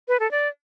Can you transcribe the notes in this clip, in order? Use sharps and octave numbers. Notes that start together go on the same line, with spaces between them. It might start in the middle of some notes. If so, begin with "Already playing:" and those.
B4
A4
D5